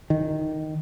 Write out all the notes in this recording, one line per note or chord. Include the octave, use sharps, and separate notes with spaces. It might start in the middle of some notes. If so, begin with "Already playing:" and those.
D#3